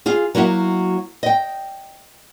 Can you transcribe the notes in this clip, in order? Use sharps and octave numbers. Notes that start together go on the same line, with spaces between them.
F4 G#4
F#3 A#3 E4 F#4
D#5 G5